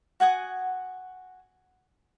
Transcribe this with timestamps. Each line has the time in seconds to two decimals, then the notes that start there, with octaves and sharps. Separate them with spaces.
0.20 F#4 F#5 G#5 D#6